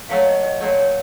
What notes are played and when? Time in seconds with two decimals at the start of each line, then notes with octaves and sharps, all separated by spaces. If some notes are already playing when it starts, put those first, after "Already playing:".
0.09 A#2 F#3 A3 F5
0.26 D#5
0.43 D#5
0.60 A#2 F#3 A3 D5
0.78 C#5